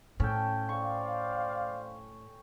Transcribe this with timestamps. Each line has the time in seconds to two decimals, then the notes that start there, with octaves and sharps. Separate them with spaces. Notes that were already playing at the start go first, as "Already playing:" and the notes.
0.20 A2 C#4 A4 G5
0.69 C5 D5 F5 C#6